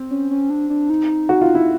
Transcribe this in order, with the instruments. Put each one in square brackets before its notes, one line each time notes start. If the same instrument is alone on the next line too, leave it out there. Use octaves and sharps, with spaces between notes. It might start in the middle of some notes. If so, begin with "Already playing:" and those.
Already playing: [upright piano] C4
[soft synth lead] C#4
C#4
D4
D4
D#4
[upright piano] F#4
F4
E4